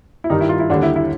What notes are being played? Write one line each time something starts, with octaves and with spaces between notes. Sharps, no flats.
E4
G2 D#3 G3 D#4
E4
F4
E4
D#2 D3 G3 D4
E4
E4